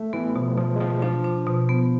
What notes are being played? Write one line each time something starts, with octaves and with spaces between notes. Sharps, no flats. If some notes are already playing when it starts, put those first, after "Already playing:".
Already playing: A3
E3 B3
B2 F3
B2 F3
G#3
B2 F3
F3 D4
D4
B2
B3